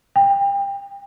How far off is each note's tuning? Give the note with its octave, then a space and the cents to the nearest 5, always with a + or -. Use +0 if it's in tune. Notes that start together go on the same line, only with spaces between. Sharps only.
G5 +25